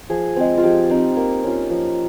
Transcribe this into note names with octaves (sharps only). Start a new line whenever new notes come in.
F3 G#4
G#3 C4
F4
F3 G4
C4 D#4
A#3
C#4 F4
F3